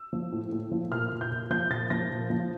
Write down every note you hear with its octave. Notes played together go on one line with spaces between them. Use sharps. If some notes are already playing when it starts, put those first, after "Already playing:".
Already playing: E6
F3
A2
A2
F3
A#2 F6
A#2
G6
A#2
F3 G6
A#2 A6
F3 A#6
A#2
F3